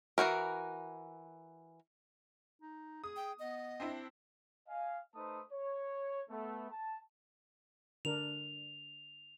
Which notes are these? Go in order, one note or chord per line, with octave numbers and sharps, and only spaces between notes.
E3 A3 F#4 A#4
D#4
G#4 D#6
G5
B3 D#5
C4 D4 E4
D#5 F5 G#5
A3 D#4 B4 C5 A5 D#6
C#5
A3 B3
A5
D3 D4 A#4 F7